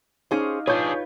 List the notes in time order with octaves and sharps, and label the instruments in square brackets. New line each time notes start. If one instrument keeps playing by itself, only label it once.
[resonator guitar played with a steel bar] C#4 G#4 C5 [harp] D#4 G4 F5
[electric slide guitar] D4 G#4 [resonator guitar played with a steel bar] F4 B4 [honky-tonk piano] C#5 G6